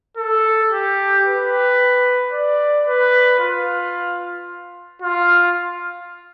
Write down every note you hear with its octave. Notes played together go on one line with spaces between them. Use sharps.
A4
G4
B4
D5
B4
F4
F4